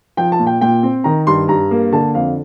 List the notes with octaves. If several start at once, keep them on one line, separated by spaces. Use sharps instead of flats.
F3 G5
A5
A#2
G5
A#2 G5
C4
D#3 A#5
G2 C6
G2 A#5
A#3
D3 A5
F2 F5